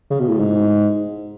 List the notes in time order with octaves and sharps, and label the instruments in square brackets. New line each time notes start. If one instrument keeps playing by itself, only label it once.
[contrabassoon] C#3
B2
A2
G#2